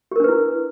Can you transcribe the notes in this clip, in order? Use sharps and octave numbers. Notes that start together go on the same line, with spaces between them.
D4 E4 G4 A#4 B4